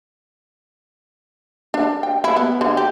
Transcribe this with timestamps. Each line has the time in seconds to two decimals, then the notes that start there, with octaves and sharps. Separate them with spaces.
1.74 D4
2.03 G5
2.24 E4
2.36 B3
2.61 D3
2.77 G4